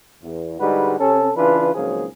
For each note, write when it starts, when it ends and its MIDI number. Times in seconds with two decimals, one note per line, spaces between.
0.24 0.59 40
0.60 0.95 44
0.60 0.95 50
0.60 0.95 55
0.60 0.95 56
0.60 0.95 66
0.60 0.95 71
0.99 1.31 48
0.99 1.31 61
0.99 1.31 69
1.36 1.71 49
1.36 1.71 52
1.36 1.71 62
1.36 1.71 65
1.36 1.71 71
1.75 2.06 32
1.75 2.06 37
1.75 2.06 53
1.75 2.06 54
1.75 2.06 58
1.75 2.06 68